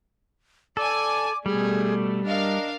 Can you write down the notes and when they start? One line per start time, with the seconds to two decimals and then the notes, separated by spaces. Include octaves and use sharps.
0.77 A4 D5 G#5 D6
1.46 B2 G3 A3 G#4
2.26 D4 A#4 D#5 F5